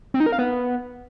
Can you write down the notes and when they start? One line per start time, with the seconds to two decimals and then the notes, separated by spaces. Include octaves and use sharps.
0.14 C4
0.20 D#4
0.26 A#4
0.32 F5
0.39 B3